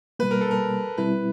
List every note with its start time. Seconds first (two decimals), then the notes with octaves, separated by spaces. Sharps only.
0.19 B2 G3 A#3 B4
0.31 A#4
0.41 A4
0.51 A#4
0.98 B2 G3 C4 E4 B4